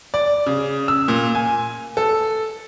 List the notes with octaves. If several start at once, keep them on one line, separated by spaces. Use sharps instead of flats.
D5
C#3
E6
A#2
G#5
A4